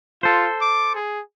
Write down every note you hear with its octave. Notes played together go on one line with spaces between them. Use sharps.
F4 A4 C5
D6
G#4